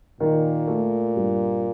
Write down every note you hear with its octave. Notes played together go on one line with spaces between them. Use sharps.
A#2 D#3
A3
G2